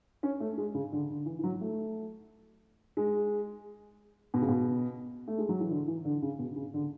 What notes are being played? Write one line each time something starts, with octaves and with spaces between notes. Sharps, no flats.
C#4
A3
G#3
C#3
D3
D3
E3
E3
F#3
A3
G#3
B2
C#3
B2
A3
G#3
F#3
E3
D3
E3
D3
C#3
B2
C#3
D3